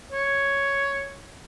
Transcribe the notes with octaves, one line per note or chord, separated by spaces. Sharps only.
C#5